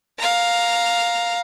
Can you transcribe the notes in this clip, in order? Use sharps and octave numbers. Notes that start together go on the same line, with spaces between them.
F5 A#5